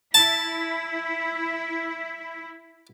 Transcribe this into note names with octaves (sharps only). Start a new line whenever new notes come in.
E4 A5